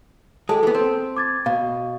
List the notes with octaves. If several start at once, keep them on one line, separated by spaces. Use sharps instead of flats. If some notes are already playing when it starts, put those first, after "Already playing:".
G#3 G4 A4 A5
E3 B3
C4
D6 G#6 A6
B2 F5